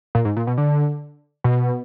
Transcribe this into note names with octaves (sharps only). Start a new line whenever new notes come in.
A#2
G#2
A#2
B2
D3
B2